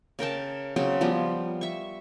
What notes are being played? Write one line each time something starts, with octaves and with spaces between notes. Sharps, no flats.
C#3 A#4 G5 A5
C#3 F#3 C4 G#4
F3 G3 B3
E5 C#6